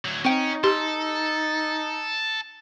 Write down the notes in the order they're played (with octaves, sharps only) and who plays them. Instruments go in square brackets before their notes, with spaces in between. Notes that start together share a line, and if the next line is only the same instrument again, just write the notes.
[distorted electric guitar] D2 F#3
[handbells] C4 G5 [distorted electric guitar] C#4 [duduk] D#4
[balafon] G4 [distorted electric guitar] A4 [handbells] C6